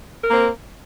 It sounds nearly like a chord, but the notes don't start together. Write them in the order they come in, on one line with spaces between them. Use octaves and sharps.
A#4 A#3 C4